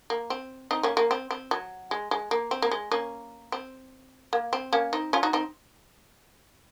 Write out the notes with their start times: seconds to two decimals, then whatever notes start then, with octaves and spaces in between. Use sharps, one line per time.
0.10 A#3
0.30 C4
0.71 C4 D#4
0.83 A#3 C#4
0.97 A#3 C#4
1.11 C4
1.31 C4
1.51 F#3
1.91 G#3
2.11 G#3
2.31 A#3
2.51 C4
2.62 A#3
2.71 G#3
2.91 A#3 C#4
3.52 C4
4.33 A#3
4.53 C4
4.73 A#3 C#4
4.93 C4 D#4
5.13 C#4 F4
5.23 D#4 F#4
5.33 C4 D#4